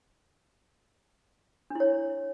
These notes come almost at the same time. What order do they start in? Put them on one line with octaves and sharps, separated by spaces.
D4 E4 C#5